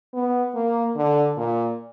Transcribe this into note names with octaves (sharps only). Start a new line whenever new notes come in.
B3
A#3
D3
A#2